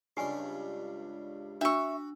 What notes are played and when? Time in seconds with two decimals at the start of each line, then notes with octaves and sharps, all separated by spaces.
0.17 C#2 G2 G4 G#5 C6
1.61 D4 F#4 E5 C#6 E6